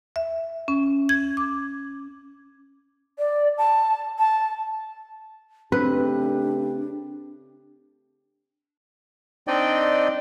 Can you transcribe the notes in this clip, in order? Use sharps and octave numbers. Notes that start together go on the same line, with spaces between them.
E5
C#4
G#6
D6
D5
A5
A5
C#3 A3 C4 D4 G4 B4
C4 D4 D#4 D5 D#5 G5